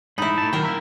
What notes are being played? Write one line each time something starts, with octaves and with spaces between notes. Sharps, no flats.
G#2 D#4 E4 B5
A2 A5
D#3 F#3 A#4 G5
A#3 E5